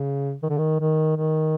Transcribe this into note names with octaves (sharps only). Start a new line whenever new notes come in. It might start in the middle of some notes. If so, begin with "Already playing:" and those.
Already playing: C#3
D#3
D3
D#3
D#3
D#3